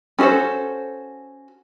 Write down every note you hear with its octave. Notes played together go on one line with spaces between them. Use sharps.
C#4 F#4 G#4 A4 C5